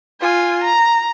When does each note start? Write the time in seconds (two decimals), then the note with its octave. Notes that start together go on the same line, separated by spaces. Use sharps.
0.21 F4 G#5
0.64 A#5